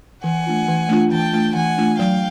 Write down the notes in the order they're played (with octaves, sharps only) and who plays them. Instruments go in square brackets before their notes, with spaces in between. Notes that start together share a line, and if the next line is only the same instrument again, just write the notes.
[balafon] E3 [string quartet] F#5 G#5
[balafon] A3 D4 F4
E3
A3 D4 F4
[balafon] E3 [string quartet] G5 A5
[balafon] A3 D4 F4
[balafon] E3 [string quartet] F#5 G#5
[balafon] A3 D4 F4
[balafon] F#3 [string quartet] F5 G5